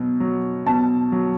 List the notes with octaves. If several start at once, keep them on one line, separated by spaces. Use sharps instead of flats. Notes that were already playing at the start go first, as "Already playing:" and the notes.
Already playing: B2 F#3
F#3
B2 A5
F#3